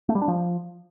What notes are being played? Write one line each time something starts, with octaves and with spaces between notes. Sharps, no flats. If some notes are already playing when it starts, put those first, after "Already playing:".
A3
G3
D4
F3